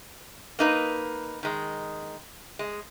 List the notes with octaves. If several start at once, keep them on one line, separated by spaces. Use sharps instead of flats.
A#3 D#4 B4
D#3 G#3
G#3